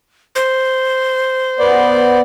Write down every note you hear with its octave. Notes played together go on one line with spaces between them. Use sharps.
C5
B3 D5